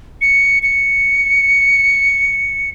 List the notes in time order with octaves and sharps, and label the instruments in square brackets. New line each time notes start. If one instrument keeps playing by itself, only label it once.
[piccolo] C#7
C#7